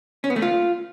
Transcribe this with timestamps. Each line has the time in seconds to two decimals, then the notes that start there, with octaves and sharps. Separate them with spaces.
0.24 C#4
0.30 B3
0.36 A3
0.42 F4